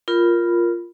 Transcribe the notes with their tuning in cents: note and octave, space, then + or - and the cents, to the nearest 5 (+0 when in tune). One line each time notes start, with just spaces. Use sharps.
F4 -5 A#4 +5 B5 +0